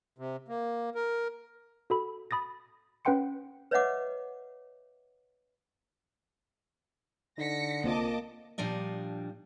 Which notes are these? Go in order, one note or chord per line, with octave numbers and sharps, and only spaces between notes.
C3
A#3
A#4
F#4 A4 B5
B5 D#6 A6 A#6
C#4 B4 F#5 G5 C6 C#7
B4 C#5 D#5 E5 F#5 D6
D3 D#4 A#6 B6 C#7
C2 A#3 C4 F4 D#5 A5 D6
A#2 F3 G3 D4 D#5